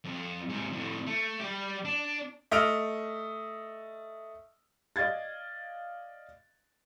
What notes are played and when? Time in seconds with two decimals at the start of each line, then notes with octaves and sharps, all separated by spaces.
0.04 F2
0.50 G#2 C3
0.72 F2 A2
1.07 A3
1.40 G3 G4
1.85 D4
2.51 A3 D#5 E6 F6 D7 F7
4.96 D5 D#5 F5 G#6 A6